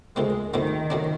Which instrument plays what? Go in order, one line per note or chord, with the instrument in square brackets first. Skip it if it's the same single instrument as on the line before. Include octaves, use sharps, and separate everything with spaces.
[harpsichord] D2 D3 F3 A#3 [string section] G#3
[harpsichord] D2 D3 F3 A#3 [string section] D#3
[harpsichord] A2 F#3 A#3 D4